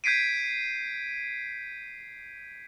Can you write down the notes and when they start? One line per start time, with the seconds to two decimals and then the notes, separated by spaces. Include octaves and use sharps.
0.04 G6 G#6 B6 C7 D7 D#7